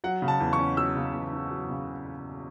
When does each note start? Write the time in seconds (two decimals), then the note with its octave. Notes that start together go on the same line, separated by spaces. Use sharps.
0.04 F#3 F#5
0.22 C#3
0.28 A5
0.40 E2
0.53 C#6
0.59 C#4
0.77 F#3 E6
0.96 C#3
1.14 E2
1.33 C#4
1.51 F#3
1.70 C#3